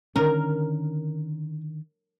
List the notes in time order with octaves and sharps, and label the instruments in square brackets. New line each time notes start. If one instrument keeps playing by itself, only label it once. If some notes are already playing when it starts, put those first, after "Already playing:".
[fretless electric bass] D3 D#3 C#4 [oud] A#4